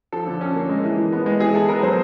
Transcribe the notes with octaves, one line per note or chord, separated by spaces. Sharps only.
F3 A4
D3
C#4
A#3
G#3
E3
E3
B3
G#3
E3 G#4
E4 A4
B3 A#4
F#3 C5